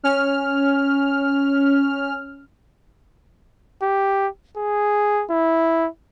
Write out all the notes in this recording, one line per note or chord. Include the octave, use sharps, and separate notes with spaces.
C#4 F6
G4
G#4
E4